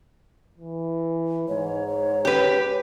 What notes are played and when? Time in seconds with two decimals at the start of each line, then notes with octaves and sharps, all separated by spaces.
0.58 E3
1.48 G#2 C#5
2.25 G4 B4